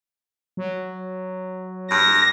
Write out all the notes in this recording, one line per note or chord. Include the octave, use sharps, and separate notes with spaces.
F#3
G2 A#6